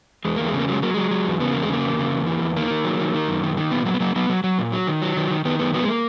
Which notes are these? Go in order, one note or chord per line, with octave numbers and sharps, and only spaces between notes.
E2 G#3
E2 A#3
G#3
C#3
A#3
F#3 G#3
F#3 A#3
F#3 G#3
F#3
E2
C#3 B3
E2 A#3
G#3
C#3 A#3
E2
C#3
E2
E3
E2
D#3 A#3
D#3
F#3
D#3
D#3
F#2
D#3
D#3
A#2 B3
F#3 A#3
B3
F#3 A#3
F#3 B3
F#3
F#3
A#2
F#3
D#3
F#3
D#3
D#3
D#3 B3
F#2 B3
F#3 B3
G#3
A#3